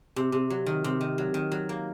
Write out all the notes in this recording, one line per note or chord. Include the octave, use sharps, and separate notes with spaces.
C3
C3
F#3
D#3
C3
D#3
F#3
D#3
F#3
A#3